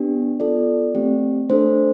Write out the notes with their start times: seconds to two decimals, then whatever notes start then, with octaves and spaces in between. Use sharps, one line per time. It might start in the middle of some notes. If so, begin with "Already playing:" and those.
Already playing: B3 D4 G4
0.40 B3 F4 A4 D5
0.95 A3 C4 G4
1.49 A3 D4 A4 C5